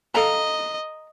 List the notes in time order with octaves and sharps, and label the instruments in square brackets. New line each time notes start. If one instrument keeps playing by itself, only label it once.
[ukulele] A4 F5 A#5 [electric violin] D#5